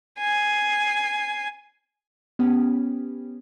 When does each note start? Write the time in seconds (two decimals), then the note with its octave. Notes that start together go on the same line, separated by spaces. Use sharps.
0.19 G#5 C7
2.39 B3 C#4 G4